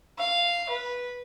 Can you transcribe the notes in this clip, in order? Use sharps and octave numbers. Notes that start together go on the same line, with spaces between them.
F5
B4